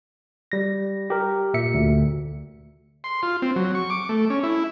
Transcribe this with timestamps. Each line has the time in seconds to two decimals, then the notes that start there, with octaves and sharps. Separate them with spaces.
0.52 G3 A#6
1.10 G4 A#4
1.54 A#2 E5 C#7
1.74 D2
3.04 C6
3.23 F4
3.42 C4
3.56 F#3
3.75 C#6
3.90 D6
4.09 A3
4.30 C#4
4.43 E4